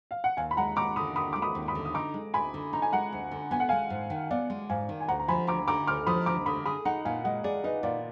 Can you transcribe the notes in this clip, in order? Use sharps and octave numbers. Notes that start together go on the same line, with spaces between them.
F5
F#5
D#2 F5 G#5
B5
G#3 F#5 A#5
D#2 A#5 D6
D3 B5 D#6
D#2 B5 D#6
G#3 D6
B5 D#6
D#2
B5 D#6
D3
D#6
D#4 A#5 D6
G#3
D2 G#5 B5
D3
D#4 A#5
G#5
G#3 F#5 A#5
D2
D3
B3 G#5
F#5
G#3 F5 G#5
G#2
D#3
B3 D5 F5
G#3
G#2 F5 G#5
D#3
G#5
D2 F#5 A#5
A#5
F3 G#5 B5
D2 A#5 D6
D3 A#5 D6
D2 D6 F6
F3 B5 D#6
D2 A#5 D6
D3 B5 D#6
G#4 B5 D#6
D#4 F#5 A#5
A#2 F5 G#5
G#3 D#5 F#5
G#4 D5
D#4 B4 D#5
A#2 D5 F5